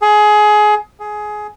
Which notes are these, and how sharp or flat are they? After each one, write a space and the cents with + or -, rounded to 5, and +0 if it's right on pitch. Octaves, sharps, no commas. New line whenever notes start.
G#4 +20
G#4 +15